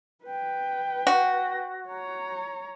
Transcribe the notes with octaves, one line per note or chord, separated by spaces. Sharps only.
B4 G5
F#4
C#5 A#5